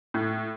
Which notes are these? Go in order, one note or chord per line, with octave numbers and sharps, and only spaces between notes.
A2